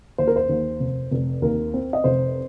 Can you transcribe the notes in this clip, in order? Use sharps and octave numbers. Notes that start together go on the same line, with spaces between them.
D#2 C5
A#4
C5
D#2
F1
F1
D#2 A#4
C4
D#5
F1 C5